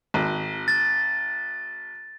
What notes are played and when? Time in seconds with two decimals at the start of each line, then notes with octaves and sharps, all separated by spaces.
0.14 G#1
0.68 A6